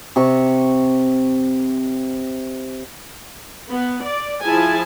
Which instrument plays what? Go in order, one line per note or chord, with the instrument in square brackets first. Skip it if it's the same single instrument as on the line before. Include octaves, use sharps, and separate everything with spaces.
[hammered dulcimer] C3 C#6
[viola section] B3
D5
F3 E4 G#4 G#5 A5